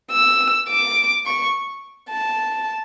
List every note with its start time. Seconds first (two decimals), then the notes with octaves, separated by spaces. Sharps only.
0.12 E6
0.69 D6
1.26 C#6
2.10 A5